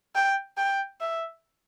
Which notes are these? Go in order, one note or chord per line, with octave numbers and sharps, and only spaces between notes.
G5
G5
E5